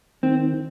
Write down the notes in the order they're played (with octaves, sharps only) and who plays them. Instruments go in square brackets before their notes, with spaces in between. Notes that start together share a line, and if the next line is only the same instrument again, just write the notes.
[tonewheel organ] D#3 [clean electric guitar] C4